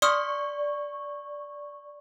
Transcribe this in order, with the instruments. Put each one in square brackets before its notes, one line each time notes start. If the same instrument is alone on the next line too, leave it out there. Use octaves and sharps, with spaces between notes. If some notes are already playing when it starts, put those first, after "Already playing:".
[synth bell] D5 C#6 [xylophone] C6 D#6 F6